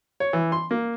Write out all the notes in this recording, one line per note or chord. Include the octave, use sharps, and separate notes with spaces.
C#5
E3
C6
A#3